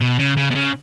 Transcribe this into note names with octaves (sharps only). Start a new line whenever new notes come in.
B2
C#3
C#3
B2
C#3